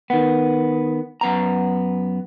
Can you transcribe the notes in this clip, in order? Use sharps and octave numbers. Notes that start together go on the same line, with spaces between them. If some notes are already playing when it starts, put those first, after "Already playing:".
D#3 B3
F#2 B3 A#5